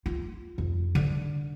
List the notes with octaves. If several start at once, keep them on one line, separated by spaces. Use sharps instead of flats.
F4
F2
D3